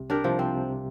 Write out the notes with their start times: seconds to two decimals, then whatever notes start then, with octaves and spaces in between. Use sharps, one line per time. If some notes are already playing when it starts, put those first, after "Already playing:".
Already playing: C2 C3
0.10 D4 G4 A#4
0.24 C2 C3 F3
0.39 C4